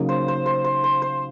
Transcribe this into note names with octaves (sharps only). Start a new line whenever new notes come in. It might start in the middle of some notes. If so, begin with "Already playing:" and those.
Already playing: C#3 F#3 A#3 D#4
C5
C5
C5
C5
C5
C5